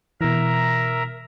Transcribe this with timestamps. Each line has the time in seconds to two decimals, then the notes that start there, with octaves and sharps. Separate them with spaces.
0.21 B2 E3 A#4 E5 A#5